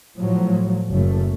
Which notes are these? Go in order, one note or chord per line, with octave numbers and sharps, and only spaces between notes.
A2 F3 F#3
F#1 F#2 A3